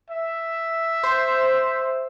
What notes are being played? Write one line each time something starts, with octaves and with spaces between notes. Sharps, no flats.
E5
C5